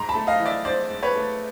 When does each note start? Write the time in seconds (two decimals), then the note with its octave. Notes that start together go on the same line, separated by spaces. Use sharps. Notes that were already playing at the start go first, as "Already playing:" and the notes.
Already playing: G#2 A#5 C6
0.09 A5 B5
0.15 A3
0.27 D#5 F5
0.39 E3
0.46 D5 E5
0.65 G#2 C5 D5
0.90 G#2
1.03 B4 C#5
1.16 A3